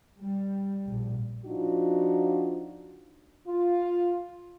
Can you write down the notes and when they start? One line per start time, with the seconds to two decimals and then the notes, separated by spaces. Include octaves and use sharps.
0.19 G3
0.87 A#1
1.46 F3 D4 D#4 F4 F#4
3.47 F4